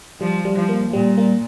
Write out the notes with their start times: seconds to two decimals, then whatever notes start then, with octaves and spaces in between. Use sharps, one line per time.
0.20 F3 G3
0.45 G3
0.57 F3
0.69 A#3
0.93 A#2 G3
1.18 A#3